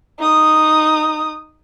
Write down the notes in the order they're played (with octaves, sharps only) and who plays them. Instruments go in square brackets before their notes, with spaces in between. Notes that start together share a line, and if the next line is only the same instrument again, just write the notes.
[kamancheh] D#4 D#6